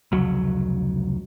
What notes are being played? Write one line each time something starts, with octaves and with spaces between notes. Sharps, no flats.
F1 C#2 F#3